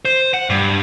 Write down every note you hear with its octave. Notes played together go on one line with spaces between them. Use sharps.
C5
F#5
G2